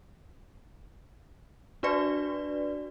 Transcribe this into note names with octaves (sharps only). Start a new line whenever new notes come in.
D4 F#4 B4 D5